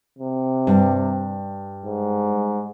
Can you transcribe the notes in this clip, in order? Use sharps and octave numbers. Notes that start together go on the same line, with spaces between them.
C3
G2
G#2